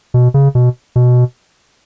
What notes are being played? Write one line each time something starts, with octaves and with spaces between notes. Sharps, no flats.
B2
C#3
B2
B2